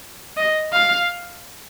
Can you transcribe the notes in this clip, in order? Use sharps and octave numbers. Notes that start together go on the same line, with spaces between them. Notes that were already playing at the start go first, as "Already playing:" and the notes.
D#5
F5